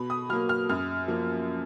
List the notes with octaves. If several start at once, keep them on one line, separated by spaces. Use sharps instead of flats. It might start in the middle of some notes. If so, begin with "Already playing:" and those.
Already playing: B2 B5
D#6
F#3 A#3 F6
F6
F#2 F6
F3 A#3